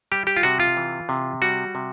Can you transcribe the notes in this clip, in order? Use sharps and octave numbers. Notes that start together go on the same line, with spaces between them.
G3 G4
G4
F4
C3 F#4
F4
E3
C3
G3 F#4
C3